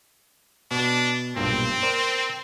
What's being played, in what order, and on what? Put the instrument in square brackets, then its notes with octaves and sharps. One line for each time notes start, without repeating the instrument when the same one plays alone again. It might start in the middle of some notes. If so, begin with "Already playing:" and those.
[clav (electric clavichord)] B2 [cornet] D4
[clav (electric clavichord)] B1 G2 A#2 [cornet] C4
[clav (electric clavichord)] A#4 C5 D5